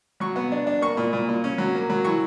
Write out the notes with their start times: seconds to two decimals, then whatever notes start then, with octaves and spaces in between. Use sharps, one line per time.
0.20 F#3 C#6
0.36 B3
0.52 D4
0.67 D4
0.81 A#3 C#6
0.97 A#2
1.13 A#2
1.29 A#2
1.44 C#4
1.58 F#3
1.75 A#3
1.90 F#3
2.04 E3 C#6